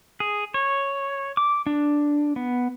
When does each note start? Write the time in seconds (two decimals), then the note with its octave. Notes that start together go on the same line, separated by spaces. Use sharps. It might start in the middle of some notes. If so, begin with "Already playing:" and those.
0.20 G#4
0.54 C#5
1.37 D6
1.67 D4
2.36 B3